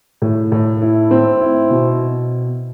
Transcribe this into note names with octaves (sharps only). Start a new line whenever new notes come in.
A2
A2
E4
C4
E4
B2